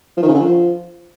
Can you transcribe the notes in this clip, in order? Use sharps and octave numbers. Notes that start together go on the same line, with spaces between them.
F3
D#3
C#3
D3
F3